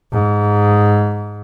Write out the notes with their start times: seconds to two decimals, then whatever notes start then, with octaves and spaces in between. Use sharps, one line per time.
0.12 G#2